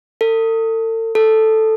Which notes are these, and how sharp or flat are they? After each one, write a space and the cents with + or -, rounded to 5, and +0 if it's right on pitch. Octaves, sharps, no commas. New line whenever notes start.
A4 +40
A4 +0